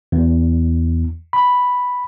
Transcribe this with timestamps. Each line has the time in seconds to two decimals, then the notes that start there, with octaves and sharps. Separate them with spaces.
0.12 E2
1.33 B5